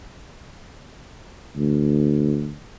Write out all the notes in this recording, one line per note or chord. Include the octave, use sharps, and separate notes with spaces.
D2